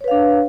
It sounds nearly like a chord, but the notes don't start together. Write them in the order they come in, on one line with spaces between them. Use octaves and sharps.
C#5 B4 F5 D4